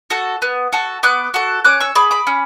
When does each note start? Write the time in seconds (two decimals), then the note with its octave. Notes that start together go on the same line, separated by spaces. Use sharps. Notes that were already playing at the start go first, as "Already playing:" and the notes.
0.10 F#4 A4
0.42 B3
0.73 F#4 A4
1.03 B3 D6 F#6
1.34 F#4 A4
1.65 C#4 D6 F#6
1.80 C#6 E6
1.95 G#4 B5 D6
2.11 B5 D6
2.27 C#4